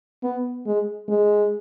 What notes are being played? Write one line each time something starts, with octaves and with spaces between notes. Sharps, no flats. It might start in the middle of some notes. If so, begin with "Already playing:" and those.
B3
G#3
G#3